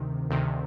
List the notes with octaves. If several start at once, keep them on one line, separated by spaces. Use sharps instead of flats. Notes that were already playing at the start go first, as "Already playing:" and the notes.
Already playing: D2 C3 D#3
D2 C3 D#3